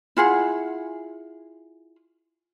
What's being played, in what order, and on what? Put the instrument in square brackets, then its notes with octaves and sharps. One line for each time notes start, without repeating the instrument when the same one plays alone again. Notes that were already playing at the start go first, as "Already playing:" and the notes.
[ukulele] E4 F4 G#4 F#5